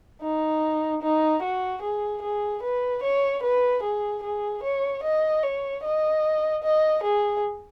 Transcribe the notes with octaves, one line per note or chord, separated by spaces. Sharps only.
D#4
D#4
F#4
G#4
G#4
B4
C#5
B4
G#4
G#4
C#5
D#5
C#5
D#5
D#5
G#4